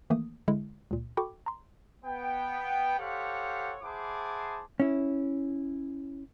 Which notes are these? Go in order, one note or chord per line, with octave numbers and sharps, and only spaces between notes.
D#3 E3 A3 A#3 D#6
D3 G#3 E4
C#2 A#2
F#4 A4 G5 B5 C#6 D6
A#5 C6
B3 G5
G4 A4 C5 C#5 F5 F#5
E4 G#4 C5 F#5 A5 D6
C#4 E4